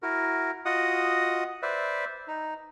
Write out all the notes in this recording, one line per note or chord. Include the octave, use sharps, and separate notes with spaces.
E4 F#4 A#4
F4 F#4 D#5 F#5 D#6
B4 C5 D5 E5
D#4